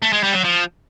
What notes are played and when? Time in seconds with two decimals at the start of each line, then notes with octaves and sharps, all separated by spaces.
0.02 A3
0.13 G#3
0.23 G3
0.33 F#3
0.44 F3